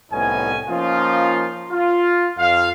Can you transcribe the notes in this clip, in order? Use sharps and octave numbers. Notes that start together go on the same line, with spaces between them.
C2 A2 B3 C#4 D#4 G#5
F3 A#3 C#4 D#4 F4
F4
F2 F5